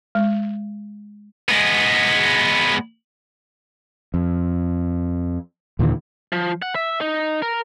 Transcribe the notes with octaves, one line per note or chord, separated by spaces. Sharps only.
G#3
G#3 B3
F2
D#2 A#2 D3 E3
F3
F#5
E5
D#4
A#4